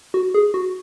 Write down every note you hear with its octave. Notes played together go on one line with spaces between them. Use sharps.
F#4
G#4
F#4